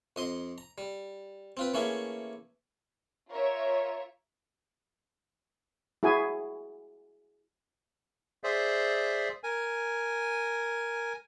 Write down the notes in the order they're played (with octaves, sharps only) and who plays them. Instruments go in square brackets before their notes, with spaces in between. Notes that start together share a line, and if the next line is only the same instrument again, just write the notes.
[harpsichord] F2 D#5 C6
A#5
G3
C4 F4 B4
E3 A3 A#3 C#4 E4 G#4
[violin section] F4 A#4 C#5 E5
[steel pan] E4 F#4 G#4 G#5
[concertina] G#4 C5 D5 E5
A#4 G#5